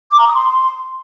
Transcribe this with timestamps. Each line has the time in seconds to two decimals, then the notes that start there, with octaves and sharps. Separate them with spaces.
0.11 D6
0.19 A#5
0.27 D#6
0.34 C6